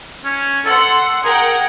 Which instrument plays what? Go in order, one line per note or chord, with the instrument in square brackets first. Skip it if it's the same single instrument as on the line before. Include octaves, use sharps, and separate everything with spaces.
[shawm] C#4
[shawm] A4 [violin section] F#5 C6
[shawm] G#4 [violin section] A#4 F#5 G5